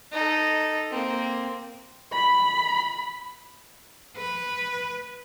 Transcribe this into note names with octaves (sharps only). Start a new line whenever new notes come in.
D#4 A4
A#3 C4
B5
B4